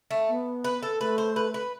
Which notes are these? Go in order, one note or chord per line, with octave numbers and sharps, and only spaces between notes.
A3
B3
B4
A4
A3 B4
C5
B4
B4